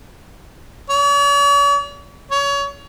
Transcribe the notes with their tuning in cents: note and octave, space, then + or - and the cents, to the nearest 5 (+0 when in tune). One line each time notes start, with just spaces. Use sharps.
C#5 +45
C#5 +25